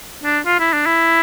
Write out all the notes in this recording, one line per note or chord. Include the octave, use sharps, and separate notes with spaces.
D4
F4
E4
D4
E4